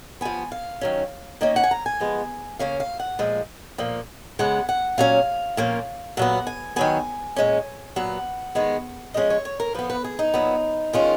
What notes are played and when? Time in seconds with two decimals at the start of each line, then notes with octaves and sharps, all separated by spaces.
0.21 F3 B3 G#5
0.52 F5
0.81 D#3 F#3 C#4
1.41 D#3 A#3 C#4 D#5
1.56 F#5
1.64 G#5
1.71 A#5
1.86 G#5
2.00 F3 G#3 B3
2.59 C#3 F#3 A#3 C#4 F5
2.80 F5
3.00 F#5
3.19 A#2 F3 G#3
3.78 A#2 F3 A#3
4.39 C#3 G#3 B3 F#5
4.69 F#5
4.98 A#2 F#3 C#4 F5
5.57 A#2 F3 A#3 C#4
6.17 A#2 F#3 B3 F#5
6.47 G#5
6.76 D#3 F#3 B3 G#5
7.36 A#2 G#3 C#4
7.96 A#2 F#3 B3 F#5
8.55 D#3 G#3 B3
9.14 F3 G#3 C#4 D#5
9.30 C#5
9.45 C#5
9.60 A#4
9.74 F3 B3 B4
9.90 B4
10.04 G#4
10.19 D#4
10.34 A#2 F#3 B3
10.93 D#3 G#3 C#4 F4